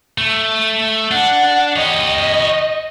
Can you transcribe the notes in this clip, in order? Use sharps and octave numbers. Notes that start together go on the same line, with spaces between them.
A3
D4 F#5
G4 C#5 D#5